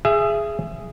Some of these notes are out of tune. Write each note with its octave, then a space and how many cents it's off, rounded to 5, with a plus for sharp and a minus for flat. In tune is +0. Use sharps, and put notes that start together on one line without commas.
G#4 +0 E5 +25